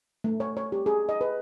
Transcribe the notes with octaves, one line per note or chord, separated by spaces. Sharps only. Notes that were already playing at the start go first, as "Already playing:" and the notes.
A3
C#5
C#5
G4
G#4
D#5
B4